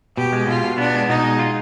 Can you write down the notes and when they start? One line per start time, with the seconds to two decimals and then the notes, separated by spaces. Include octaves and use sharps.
0.17 B2 G4
0.33 G#3
0.47 B2 F4
0.63 B2
0.78 B3 D4
0.94 G#3
1.09 B2 D#4
1.24 G#3
1.39 F4